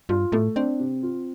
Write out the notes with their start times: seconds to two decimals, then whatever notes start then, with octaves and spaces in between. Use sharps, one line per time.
0.09 G2 F4
0.32 A2 A3
0.56 C4 D4
0.80 C3
1.03 F4